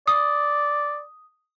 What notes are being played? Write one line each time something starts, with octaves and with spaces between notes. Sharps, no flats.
D5 D#6